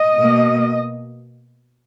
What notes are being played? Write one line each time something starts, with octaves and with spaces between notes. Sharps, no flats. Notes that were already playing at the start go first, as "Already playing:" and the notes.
Already playing: D#5
B2 A#3